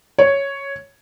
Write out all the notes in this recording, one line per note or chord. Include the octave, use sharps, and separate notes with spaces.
C#5